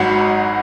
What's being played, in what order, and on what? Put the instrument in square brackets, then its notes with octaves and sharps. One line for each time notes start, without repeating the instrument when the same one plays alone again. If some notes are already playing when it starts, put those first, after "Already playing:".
Already playing: [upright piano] G#1 G#2 F#3 F#5 B5